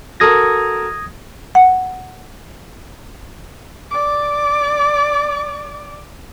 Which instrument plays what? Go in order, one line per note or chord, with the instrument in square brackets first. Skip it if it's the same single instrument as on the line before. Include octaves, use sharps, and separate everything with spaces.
[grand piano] F#4 A4 A#4 [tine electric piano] D#6 G#6 A#6
[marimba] F#5
[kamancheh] D5 D6